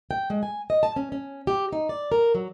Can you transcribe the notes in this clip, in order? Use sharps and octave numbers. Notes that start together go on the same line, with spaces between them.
G5
G#3
G#5
D#5
A5
C#4
C#4
G4
D#4
D5
A#4
F#3